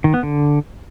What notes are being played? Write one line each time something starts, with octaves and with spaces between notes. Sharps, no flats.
D#3
B3
D3